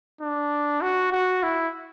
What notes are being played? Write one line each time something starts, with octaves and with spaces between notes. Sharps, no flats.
D4
F#4
F#4
E4